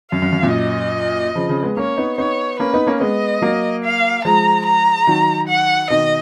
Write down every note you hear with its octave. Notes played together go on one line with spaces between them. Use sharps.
F#2 F5
F#2
F#2
F#2 A#2
D#5
C#3 F3
C#3 F3
G#3 B3
A#3 C#4 C#5
B3 D#4
B3 D#4 C#5
A#3 C#4 B4
B3 D#4
A#3 C#4
G#3 B3 D#5
F#3 A#3
F5
F3 G#3 A#5
A#5
D#3 F#3
F#5
B2 D#3 D#5